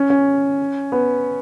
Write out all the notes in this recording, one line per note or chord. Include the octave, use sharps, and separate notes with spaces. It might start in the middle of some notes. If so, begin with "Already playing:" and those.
Already playing: C#4
C#4
B3